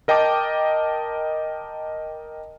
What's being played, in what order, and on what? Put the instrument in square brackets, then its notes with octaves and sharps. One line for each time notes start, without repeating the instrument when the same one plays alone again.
[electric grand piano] A#4 D#5 G5 A5 D6